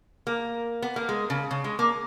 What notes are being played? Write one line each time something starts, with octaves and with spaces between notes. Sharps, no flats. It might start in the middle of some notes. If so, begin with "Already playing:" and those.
A#3
B3
A#3
G#3
C#3
C#3
G#3
A#3